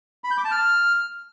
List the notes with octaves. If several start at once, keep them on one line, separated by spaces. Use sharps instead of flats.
B5
G6
D6
A5
F6